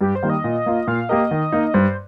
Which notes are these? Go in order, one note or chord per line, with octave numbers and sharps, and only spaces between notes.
G2 G4
C5
D#3 G3 A#3
D#5
A#2
A#3 F4
A#2 F5
A#3 G4 A#4 D#5
D#3
A#3 D#4
G2 C5